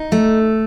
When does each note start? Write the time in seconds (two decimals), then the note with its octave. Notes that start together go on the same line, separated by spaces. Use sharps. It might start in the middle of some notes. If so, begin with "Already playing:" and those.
Already playing: D#4
0.12 A3